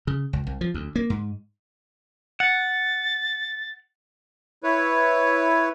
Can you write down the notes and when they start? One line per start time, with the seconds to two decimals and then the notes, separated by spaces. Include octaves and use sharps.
0.07 C#3
0.33 C#2
0.47 C2
0.61 F3
0.74 D2
0.96 A#3
1.10 G#2
2.40 F#5 A6
4.64 E4 B4 C#5